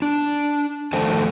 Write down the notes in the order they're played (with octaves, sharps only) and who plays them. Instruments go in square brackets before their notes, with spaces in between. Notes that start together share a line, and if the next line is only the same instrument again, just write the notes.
[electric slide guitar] D4
F2 D#3 A3 A4 C5 A5